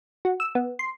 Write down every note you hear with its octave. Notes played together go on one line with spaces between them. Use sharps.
F#4
E6
B3
C6